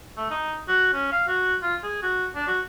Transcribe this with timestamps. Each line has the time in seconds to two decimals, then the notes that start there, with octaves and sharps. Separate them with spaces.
0.17 A3
0.30 D#4
0.68 F#4
0.93 C#4
1.12 F5
1.28 F#4
1.62 F4
1.84 G#4
2.03 F#4
2.35 D4
2.48 F#4